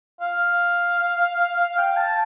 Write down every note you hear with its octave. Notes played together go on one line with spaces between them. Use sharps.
F5
G5
A5